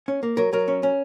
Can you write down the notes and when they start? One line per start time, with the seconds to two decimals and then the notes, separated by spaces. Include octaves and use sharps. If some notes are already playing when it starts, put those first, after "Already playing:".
0.08 C#4
0.23 A#3
0.37 F#3 A#4
0.53 F#3 A#4
0.68 C#4
0.83 C#4